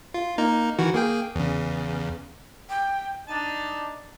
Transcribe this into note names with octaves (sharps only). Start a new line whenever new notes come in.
F4
A#3 D#4 A#4
D#3 E3 F#4
A#3 G#4 G5
E2 C#3
G5
D4 D#4 A5